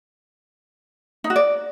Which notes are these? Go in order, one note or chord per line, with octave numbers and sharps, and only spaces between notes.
D#4
F#4
D5